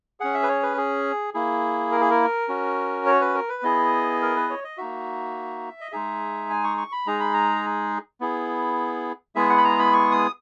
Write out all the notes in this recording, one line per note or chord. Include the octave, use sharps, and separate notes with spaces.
C#4 G#4 F#5
E5
B4
C#5
B4
G#4
A#3 E4 G#4
A#4
G#4
A#4
C#4 F#4
C#5
B4
A#4
B4
B3 E4 G#4 D#5
A#4
B4
C#5
D#5
A#3 D#4 F#4 E5
D#5
G#3 D#4 G#4 E5
G#5
C#6
C#6
B5
G#3 D#4 G#4 A#5
B5
A#5
B3 E4 G#4
G#3 B3 E4 G#4 E5
F#5
B5
A#5
B5
C#6
D#6